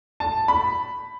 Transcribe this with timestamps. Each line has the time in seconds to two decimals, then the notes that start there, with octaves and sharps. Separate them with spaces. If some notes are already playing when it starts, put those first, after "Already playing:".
0.20 A5
0.48 B5